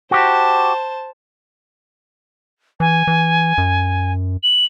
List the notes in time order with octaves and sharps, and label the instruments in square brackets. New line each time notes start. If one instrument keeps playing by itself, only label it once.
[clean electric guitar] F#4 G4 [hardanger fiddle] C5 A5
[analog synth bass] E3 [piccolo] G#5
[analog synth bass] E3
F#2
[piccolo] F#7